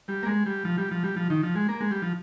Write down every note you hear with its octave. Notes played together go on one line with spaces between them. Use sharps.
G3
A#3
G#3
G3
F3
G3
F3
G3
F3
D#3
F3
G#3
A#3
G#3
G3
F3